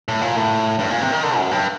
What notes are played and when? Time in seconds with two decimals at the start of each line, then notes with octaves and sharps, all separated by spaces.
0.08 A2
0.21 A#2
0.36 A2
0.79 G2
0.90 A#2
1.01 C3
1.12 D#3
1.23 D3
1.38 F#2
1.51 G2